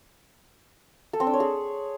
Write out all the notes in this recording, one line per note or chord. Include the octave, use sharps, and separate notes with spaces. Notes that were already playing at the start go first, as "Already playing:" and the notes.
A4
C4
D4
C#5
G#4